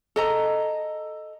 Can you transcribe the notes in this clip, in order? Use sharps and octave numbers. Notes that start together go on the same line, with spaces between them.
A4 D#5 A#5